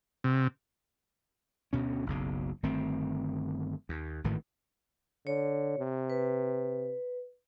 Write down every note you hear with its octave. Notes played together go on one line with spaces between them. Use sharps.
C3
D2 B2 C#4
F#1 B1 C#3
G1 D#3 A3 C4
D#2
G#1 A2 D#3 E3
D3 C#5
C3
B4